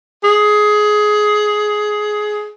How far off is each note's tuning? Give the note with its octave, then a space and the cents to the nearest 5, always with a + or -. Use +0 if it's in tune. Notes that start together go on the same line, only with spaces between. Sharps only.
G#4 +15